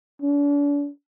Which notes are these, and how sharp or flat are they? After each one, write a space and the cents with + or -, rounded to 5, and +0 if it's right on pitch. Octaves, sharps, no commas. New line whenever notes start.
D4 -40